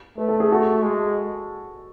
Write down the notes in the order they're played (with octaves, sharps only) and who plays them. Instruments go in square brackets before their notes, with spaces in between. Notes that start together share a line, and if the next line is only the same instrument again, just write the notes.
[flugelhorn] A3 [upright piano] B4
[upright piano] A4
G#4
F#4 A4
[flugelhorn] G#3